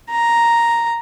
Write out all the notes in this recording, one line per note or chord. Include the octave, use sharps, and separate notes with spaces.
A#5